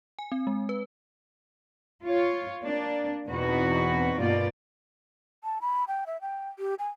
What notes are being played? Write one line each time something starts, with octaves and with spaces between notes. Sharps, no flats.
G#5
C4
G#3
B4
F4 C#5
A#3 D4
E2 B2 C4 D#4 F#4 B4
G2 B2 A#3 F4 D5
A5
B5
G5
E5
G5
G4
G#5